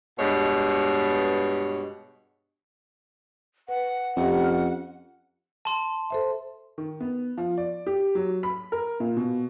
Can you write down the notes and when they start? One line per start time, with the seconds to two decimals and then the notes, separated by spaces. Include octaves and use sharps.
0.19 G2 B2 G#3 C#5
3.68 B4 F#5
4.17 F2 C#4 G4 E5
4.44 F6
5.65 A5 C6
6.10 A4 C5 E5
6.78 D#3
7.00 B3
7.38 F3
7.57 D5
7.86 G4
8.15 F#3
8.43 B5
8.72 A#4
9.00 A#2
9.17 B2